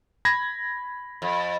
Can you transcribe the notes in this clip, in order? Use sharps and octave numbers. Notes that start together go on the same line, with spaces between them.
B5 G#6 A#6
F2